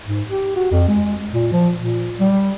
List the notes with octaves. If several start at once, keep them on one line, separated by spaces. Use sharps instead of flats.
G#2
G4
F#4
F2
G#3
A#2
F3
A#2
G3